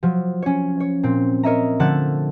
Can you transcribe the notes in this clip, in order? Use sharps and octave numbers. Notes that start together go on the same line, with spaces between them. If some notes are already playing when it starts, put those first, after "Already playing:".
F3 F#3
C#4 C#5
C#5
A#2 C4
A#4 C#5 D#5 E5 A#5
D3 F3 A3 F#5 A5 F#6